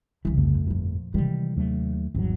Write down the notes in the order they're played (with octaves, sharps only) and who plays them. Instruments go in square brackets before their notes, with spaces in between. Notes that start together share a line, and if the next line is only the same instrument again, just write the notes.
[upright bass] C2 C#3 [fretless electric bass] E3
[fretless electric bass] G1 F2 A3
[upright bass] A#2 F3
[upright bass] C3 G#3 [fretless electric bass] D#3 E3 G3
[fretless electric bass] D#2 F#3 A3
[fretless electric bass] G#1 E2 F#3 [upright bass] G2